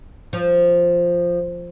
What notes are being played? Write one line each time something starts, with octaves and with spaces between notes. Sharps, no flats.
F3